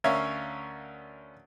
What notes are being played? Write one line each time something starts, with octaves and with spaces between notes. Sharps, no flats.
D2 C#4 A#4 C#5 E5 F5